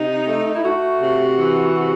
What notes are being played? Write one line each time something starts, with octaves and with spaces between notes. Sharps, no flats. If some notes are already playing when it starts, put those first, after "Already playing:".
Already playing: C3 D#4
A3
E4
A3 F#4
C3
E3
C3